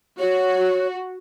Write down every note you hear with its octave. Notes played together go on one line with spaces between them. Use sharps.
F#4 C#5